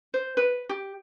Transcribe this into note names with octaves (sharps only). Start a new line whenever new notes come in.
C5
B4
G4